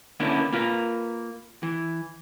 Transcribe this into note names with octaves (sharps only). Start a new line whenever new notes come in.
D3 A#3 B3 C#4 D4 E4
A#3 F4 A#4 B4
E3